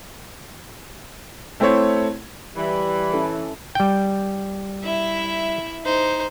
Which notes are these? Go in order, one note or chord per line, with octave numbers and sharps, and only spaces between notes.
A3 C4 E4 C5 C#5
E3 G3 B5
C#4 E4 A4
G3 G5
E4 E5
D#4 C5